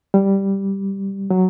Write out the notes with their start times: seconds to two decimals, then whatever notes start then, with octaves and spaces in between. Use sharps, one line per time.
0.14 G3
1.30 F#3